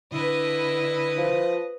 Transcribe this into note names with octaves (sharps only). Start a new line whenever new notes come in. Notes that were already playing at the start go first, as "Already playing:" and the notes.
D3 E4 B4 D#5
F3